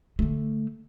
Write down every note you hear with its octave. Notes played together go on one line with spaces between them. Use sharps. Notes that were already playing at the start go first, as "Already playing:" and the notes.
D3 A3